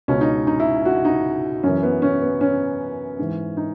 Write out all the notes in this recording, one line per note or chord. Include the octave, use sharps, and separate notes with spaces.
C#2 B2 C#4
D#4
D#4
E4
F#4
D#4
F#2 E3 C#4
B3
C#4
B3
C#4
G#2 E3
D#4